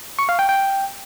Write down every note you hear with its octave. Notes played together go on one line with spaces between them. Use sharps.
C#6
F5
G5
G5